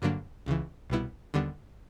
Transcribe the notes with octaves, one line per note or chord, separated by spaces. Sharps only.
G2 D3 F#3 A#3 D4
C#2 C#3 E3
C2 B2 G3 B3 E4
D#2 D3 G3 B3 D4